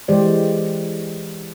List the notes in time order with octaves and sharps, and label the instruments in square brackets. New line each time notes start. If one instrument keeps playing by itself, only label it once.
[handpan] E3 G#3 G4 C5 D5